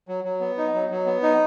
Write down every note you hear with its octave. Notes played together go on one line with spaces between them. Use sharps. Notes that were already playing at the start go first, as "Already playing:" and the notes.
F#3
F#3
B3
D#4
F#3
F#3
B3
D#4